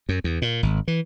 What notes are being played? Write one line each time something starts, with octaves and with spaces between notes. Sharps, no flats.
F#2
E2
A#2
G#1
E3